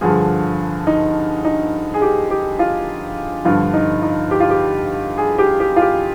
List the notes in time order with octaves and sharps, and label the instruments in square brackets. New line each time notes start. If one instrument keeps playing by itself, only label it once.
[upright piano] G2 D3 F3 G#4
D#4
D#4
G#4
G4
G4
F4
G2 D3 F3 F4
D#4
D#4
G4
F4
G4
G#4
G4
G4
F4
G4